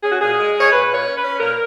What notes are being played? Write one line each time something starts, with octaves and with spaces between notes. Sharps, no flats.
C#4 G#4
F#4
A#2 G#4
G#3
G#3
C#5
A#2 B4
A#2 C#5
C#4
B4
C#4
A#2 A#4